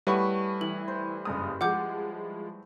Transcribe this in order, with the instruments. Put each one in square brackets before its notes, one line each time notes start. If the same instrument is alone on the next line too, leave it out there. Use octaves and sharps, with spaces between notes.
[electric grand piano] G3 B4 [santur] A3 E4 G#4 [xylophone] C#5 F#5 C#6
[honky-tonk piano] E3 [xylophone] F#7
[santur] C5
[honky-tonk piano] F#1 G2 D#6
[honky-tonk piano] F3 G#3 [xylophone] F#5 D6 G6